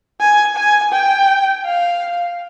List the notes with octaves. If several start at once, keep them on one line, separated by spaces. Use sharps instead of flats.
G#5
G#5
G5
F5